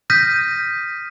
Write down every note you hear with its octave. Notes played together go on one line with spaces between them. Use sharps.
D#6 F6 G6 A#6 B6 D#7